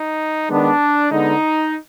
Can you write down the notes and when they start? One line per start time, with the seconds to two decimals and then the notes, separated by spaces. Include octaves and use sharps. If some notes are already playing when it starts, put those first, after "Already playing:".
Already playing: D#4
0.49 D#3 G#3 B3 D4
1.11 D3 G#3 B3 D#4